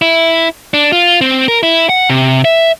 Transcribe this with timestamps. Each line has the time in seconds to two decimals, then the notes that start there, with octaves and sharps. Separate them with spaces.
0.02 E4
0.74 D4
0.92 F4
1.21 C4
1.48 A#4
1.63 E4
1.89 F#5
2.10 C3
2.45 E5